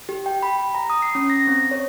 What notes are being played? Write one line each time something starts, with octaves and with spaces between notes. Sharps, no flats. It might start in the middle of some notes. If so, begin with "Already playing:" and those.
G4
G5
B5
A#5
D#6
C7
C#4
A#6
C4
C#5